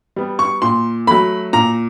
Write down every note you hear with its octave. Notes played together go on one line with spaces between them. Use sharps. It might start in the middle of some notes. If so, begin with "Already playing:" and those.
G3 B3
C#6
A#2 C6
F#3 A3 B5
A#2 A#5